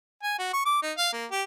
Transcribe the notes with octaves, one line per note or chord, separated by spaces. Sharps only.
G#5
F#4
C#6
D6
D#4
F5
A#3
G4